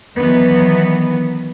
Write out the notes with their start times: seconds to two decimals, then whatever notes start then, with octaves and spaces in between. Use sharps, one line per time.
0.17 D#3 E3 F#3 B3